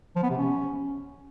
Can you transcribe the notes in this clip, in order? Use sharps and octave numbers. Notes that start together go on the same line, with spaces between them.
F3
B3
C3
C#4